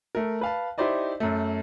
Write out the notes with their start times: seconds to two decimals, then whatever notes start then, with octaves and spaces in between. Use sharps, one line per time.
0.15 A3 A#4
0.41 B4 F5 A5
0.78 D#4 E4 G4 C5 D5 D#5
1.20 F#2 A3